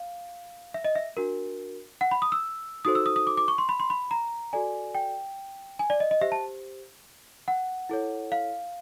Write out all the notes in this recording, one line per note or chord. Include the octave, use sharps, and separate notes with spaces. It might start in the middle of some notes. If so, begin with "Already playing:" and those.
Already playing: F5
E5
D#5
E5
D4 F#4 A#4
F#5
B5
D#6
E6
D#4 F#4 A4 C5 D#6
E6
D#6
D#6
D6
D6
C#6
C6
B5
C6
B5
A#5
F#4 A4 D5 G#5
G5
G#5
D5
D#5
D#5
G4 C5 E5
A5
F#5
E4 A4 C#5
F5